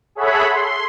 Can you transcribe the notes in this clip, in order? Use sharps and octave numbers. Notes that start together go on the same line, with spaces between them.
G#4 A4 C#5 E5 F#5 B5
C6